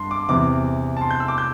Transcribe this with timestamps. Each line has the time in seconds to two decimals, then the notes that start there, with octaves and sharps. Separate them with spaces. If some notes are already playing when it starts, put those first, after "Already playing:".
Already playing: G2 C6
0.11 D6
0.29 E2 C3 E3 D6
0.97 A5
1.01 C6
1.11 G6
1.20 E6
1.28 D6
1.38 G6